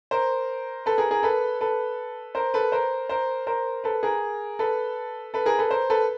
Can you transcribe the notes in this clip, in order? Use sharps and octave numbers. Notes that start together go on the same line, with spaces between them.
A#4 C5
A4 B4
G#4 A#4
G#4 A#4
A4 B4
A4 B4
A#4 C5
A4 B4
A#4 C5
A#4 C5
A#4 C5
A4 B4
G#4 A#4
A4 B4
A4 B4
G#4 A#4
A4 B4
A#4 C5
A4 B4